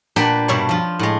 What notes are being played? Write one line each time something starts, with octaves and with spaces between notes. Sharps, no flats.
A#2 D4 G4 B4 F#5
G2 B2 D4 C#5
F3 F4
A2 G#3